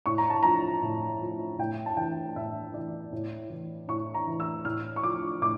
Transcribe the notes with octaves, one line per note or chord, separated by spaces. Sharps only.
A2 C#6
A#5
A5
F3 A#5
A2
F3
A2 G5
A5
E3 G5
A2 E5
E3 D5
A2
E3
A2 C#6
A#5
E3
E6
A2 F6
C#6
F3 D6
A2 D6